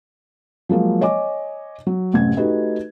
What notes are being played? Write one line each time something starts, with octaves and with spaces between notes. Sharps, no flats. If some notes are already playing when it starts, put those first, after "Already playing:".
F3 F#3 G#3 A#3
C#5 D#5 G#5 D6
F#3
A1 F#2 A2 C3 G#6
A3 D#4 F#4 G4 B4 D#5